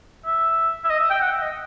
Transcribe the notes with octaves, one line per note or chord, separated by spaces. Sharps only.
E5
E5
D#5
E5
G5
F#5
E5
D#5